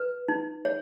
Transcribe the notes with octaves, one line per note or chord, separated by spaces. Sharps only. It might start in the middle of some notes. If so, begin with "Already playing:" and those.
Already playing: B4
D#4
C#5